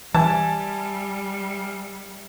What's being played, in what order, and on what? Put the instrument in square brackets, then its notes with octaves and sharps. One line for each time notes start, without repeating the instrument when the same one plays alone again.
[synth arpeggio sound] E3 [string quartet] G3 [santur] E5 G#5 [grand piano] A5